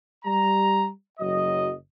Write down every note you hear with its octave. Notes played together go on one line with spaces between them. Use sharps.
G3 A#5
F#1 F#3 D#5